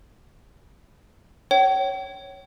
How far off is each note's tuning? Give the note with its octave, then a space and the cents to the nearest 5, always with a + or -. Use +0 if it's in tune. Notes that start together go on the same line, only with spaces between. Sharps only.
C#5 +0 G5 -40